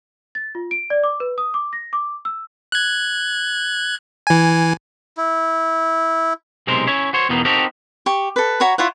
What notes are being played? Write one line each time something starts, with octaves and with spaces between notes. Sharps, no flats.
A6
F4
D7
D5
D6
B4
D#6
D6
A#6
D6
E6
F#6 G#6
E3 G#5
E4
B1 C3 G#3 A#4 C5
C#4 E4 C#5
F#4 C5 C#5
E2 B2 D#3 A#3 B3 D#4
C4 D#4 F#4 G4 A4 A#4
G4 C#6
A4 B4
F#4 C#5 A#5 B5
E4 F4 C#5 F#5